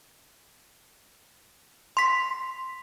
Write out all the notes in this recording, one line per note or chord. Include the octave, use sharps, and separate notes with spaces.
C6 B6